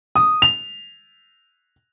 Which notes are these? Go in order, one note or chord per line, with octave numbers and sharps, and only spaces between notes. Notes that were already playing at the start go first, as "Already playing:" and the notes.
D#6
F7